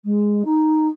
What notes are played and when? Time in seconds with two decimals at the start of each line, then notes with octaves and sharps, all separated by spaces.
0.04 G#3
0.44 D#4